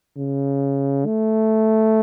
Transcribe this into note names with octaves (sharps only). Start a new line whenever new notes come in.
C#3
A3